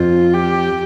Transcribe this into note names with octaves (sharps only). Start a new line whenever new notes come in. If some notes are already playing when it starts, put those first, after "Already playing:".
Already playing: F2 F4
G4